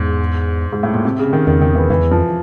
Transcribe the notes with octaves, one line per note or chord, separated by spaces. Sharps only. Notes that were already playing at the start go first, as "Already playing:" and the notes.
Already playing: E2 G#2
G#2
A2
A#2
C3
C#3
D#3
E2 D#3
D#3
E3
F2 E3
E2
F2 F3